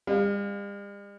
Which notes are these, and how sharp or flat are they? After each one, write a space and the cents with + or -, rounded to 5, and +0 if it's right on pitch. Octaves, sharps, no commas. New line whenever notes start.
G3 +45 F5 +0